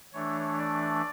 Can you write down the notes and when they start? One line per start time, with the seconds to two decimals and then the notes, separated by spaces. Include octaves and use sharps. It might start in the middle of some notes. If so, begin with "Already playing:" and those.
0.13 E3 A3 D4 C#5
0.58 D5